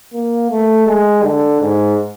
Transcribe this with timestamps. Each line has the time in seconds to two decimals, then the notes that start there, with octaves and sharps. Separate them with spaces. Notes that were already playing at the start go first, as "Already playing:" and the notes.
0.13 A#3
0.50 A3
0.87 G#3
1.24 D3
1.61 G#2